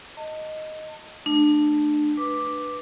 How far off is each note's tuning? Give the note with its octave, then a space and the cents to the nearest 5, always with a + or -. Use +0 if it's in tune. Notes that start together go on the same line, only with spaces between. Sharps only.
D#5 +0 A5 +35
A3 +0 D4 +30
B4 +0 D6 +0